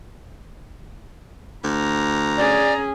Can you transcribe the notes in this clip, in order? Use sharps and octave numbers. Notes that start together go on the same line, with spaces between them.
D2 A#5
C#4 G#4 D5